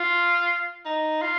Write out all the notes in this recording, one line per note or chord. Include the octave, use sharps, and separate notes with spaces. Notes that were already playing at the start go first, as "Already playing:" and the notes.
Already playing: F4
D#4
F4